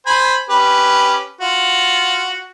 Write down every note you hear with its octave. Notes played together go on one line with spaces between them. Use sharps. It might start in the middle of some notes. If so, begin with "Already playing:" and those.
C5 G#5 B5
C#4 G4 B4
F4 F#4